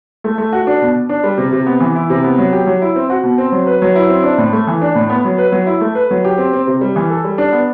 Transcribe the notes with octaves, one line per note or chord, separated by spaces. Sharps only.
A3
A3
F#4
D4
B2
B2
D4
G3
C3
C3
B3
E3
E4
C3
B3
F#3
G4
F#3
E4
C4
F#4
B2
C4
F#3
B4
F#3
E4
C4
D4
A2
A3
E3
D4
A2
B3
F#3
B4
F#3
E4
A3
B4
F#3
G4
C4
C4
C3
G3
E3
A4
G3
D4
B3